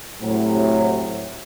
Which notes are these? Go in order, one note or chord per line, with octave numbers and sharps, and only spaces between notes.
A2 C3 F#3